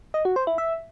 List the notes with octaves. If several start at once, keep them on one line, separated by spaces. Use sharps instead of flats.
D#5
F#4
C5
E4
E5